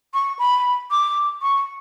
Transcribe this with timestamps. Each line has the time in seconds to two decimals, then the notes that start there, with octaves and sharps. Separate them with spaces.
0.14 C#6
0.39 B5
0.91 D6
1.42 C#6